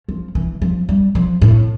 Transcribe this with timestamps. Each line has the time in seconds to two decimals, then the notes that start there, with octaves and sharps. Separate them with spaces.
0.08 F3
0.35 E3
0.62 F3
0.89 G3
1.15 F3
1.42 A2